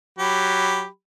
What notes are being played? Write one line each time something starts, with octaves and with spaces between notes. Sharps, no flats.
F#3 G4 B5